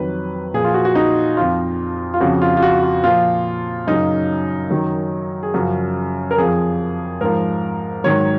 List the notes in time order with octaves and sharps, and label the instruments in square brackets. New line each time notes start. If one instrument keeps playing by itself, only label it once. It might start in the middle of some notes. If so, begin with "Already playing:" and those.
Already playing: [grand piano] F2 D#3 F#3 B4
A#2 F3 G#4
F4
F#4
F#4
D#4
F2 F3 F4
F4
F2 C#3 F3 F#4
F4
F4
F#4
F4
A#2 F3 F4
F#2 C#3 F#3 D#4
F#2 D#3 F#3
G#4
F#2 C#3 F3 F#4
A#4
F2 F3 G#4
G#2 F3 A#4
G#2 D#3 F#3 C#5